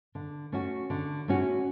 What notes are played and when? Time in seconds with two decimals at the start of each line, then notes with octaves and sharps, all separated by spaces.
0.15 D3
0.52 A3 C#4 F#4
0.90 D3
1.28 A3 C#4 F#4